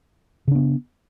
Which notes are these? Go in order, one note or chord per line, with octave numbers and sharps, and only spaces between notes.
C#3 B3 D4